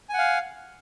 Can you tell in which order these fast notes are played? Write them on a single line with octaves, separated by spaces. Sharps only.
G#5 F#5 F5